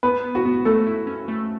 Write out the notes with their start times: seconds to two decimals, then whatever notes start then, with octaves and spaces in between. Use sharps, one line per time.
0.03 B3 B4
0.24 B3
0.35 F#4
0.45 B3
0.65 A3 A4
0.86 E4
1.07 C#4
1.28 A3